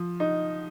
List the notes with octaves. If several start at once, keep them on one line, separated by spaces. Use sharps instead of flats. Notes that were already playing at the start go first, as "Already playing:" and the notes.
Already playing: F3
D#4